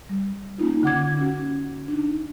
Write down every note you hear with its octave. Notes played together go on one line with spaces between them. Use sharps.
G3
A#3 C#4 D#4 F4
D3 F#5 D6 G#6
C#4 F#4
D4 D#4